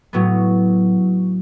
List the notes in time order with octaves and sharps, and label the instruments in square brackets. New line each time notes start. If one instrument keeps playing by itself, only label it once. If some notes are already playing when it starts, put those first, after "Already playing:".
[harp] A2 F#3 B3